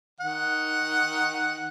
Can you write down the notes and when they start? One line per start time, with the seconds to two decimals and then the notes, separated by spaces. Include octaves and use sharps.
0.20 D#3 F#5